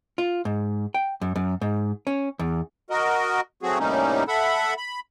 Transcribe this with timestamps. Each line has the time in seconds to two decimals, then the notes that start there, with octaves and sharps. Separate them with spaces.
0.18 F4
0.45 G#2
0.94 G5
1.21 F#2
1.36 F#2
1.61 G#2
2.07 C#4
2.39 E2
2.90 F#4 A#4 D#5
3.63 F#3 A3 C4 F#4 G#4
3.79 A2 C3 G3 A#3 C#4 D#4
4.28 A4 E5 F#5 B5
4.78 B5